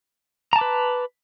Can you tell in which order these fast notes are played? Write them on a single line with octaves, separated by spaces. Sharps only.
A#5 A5 D6 B4